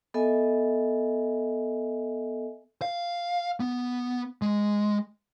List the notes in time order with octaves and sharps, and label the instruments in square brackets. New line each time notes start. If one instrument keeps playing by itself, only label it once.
[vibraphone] B3 A4 D#5 E5 G#5
[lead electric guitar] F5
B3
G#3